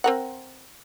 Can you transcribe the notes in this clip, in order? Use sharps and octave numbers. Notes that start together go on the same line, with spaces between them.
C4 A#4 F#5